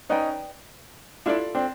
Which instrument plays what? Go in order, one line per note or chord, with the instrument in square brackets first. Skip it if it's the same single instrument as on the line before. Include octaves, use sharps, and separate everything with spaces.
[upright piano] C#4 D#4 [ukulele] B4 D5 G5
[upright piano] D4 E4 [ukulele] F4 A4 D5
[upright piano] C4 D4